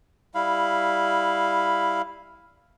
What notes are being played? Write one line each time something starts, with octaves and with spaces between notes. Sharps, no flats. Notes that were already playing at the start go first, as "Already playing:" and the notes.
G3 E4 F5 B5